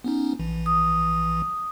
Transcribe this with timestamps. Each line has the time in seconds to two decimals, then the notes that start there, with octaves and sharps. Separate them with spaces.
0.04 B3 C#4 D#4
0.39 A#1 E3
0.66 D#6